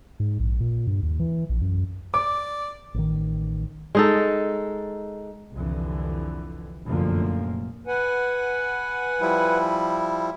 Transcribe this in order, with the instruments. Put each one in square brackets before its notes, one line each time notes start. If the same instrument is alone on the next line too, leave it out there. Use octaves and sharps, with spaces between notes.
[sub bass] G#2
A#1
A#2
G2
D#2
E3
A#1
F#2
[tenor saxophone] D5 [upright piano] D6
[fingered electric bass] A1 D#3
[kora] G#3 D#4 A4
[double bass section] C2 F2 D3 E3
F1 F#2 A#2 D3 F3 A#3
[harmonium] B4 F#5 G#5
[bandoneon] F3 G3 E4